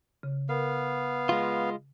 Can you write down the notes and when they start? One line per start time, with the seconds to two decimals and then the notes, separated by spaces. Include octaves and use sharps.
0.23 C#3
0.49 B3 A#4 F5
1.29 G#3 F4